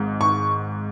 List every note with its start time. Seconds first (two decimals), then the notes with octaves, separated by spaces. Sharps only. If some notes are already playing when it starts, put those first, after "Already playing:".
Already playing: G#1 G#2
0.21 C#6